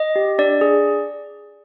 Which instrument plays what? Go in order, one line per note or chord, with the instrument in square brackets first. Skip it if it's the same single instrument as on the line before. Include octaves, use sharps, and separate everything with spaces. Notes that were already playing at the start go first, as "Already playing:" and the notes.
Already playing: [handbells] D#5
G4
D4 D5
G#4